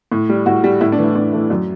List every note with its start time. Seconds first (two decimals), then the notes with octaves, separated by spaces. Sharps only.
0.12 A2
0.29 G3
0.46 A2 F#4
0.64 G3
0.81 A2 E4
0.92 D4
0.98 E3 A3
1.04 E4
1.15 A2 D4
1.32 E3 A3
1.50 F#2